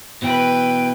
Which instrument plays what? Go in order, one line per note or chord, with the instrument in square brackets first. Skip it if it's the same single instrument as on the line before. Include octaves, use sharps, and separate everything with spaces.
[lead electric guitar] B2 E3 [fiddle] B4 G5